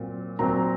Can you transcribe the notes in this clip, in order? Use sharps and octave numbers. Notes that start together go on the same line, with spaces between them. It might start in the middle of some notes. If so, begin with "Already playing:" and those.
Already playing: A#2 F#3 C4
A#2 F#3 C4 A#5